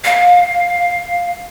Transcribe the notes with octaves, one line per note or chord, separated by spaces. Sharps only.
F5